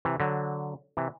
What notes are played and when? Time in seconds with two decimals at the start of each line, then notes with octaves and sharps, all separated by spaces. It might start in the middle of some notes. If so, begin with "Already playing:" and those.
0.05 C3 E3
0.20 D3 F#3
0.97 C3 E3